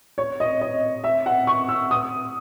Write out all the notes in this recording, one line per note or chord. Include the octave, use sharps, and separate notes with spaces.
C#5
D#5
D#5
E5
F#5
C#6
E6
D#6